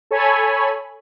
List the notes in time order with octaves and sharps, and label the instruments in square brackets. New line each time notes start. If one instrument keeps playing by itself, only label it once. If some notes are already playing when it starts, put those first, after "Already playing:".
[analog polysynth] A4 C#5 G#5 B5